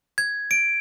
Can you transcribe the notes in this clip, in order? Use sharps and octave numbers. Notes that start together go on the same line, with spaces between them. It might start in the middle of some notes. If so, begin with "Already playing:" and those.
G#6
D7